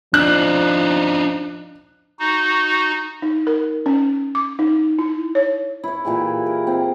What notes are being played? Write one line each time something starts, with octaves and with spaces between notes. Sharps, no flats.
F3 D4 D#4 F#6
D#4 F#4
D#4
A#4
C#4
D6
D#4
E4
C#5
E4 C#5
A#2 E3 G4 G#4
A#4
C4 F4 D#5